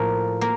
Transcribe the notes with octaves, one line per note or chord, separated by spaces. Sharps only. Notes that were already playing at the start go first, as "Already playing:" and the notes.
Already playing: A2 F3 A#3 A#4
A#3